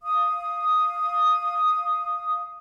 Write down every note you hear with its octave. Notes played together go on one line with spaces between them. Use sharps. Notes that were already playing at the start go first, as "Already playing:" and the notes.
F5 D#6